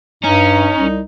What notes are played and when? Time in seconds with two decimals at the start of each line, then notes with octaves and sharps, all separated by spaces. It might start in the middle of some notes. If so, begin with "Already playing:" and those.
0.24 G2 C#4 D#4 A#5
0.78 C2